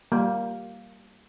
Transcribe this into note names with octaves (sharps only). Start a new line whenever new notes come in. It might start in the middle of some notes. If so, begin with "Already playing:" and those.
G3 A#3